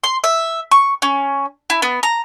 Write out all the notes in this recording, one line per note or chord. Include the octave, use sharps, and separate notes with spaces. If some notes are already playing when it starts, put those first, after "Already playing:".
C6
E5
C#6
C#4
E4
B3
A#5